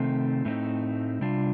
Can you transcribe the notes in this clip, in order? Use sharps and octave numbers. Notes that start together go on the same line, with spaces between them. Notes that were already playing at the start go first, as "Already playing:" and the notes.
Already playing: C3 D#3 A3 C4
A2 A3 C4 D#4
C3 G3 D4 F4